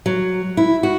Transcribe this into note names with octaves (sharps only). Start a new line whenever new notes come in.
F#3
E4
F#4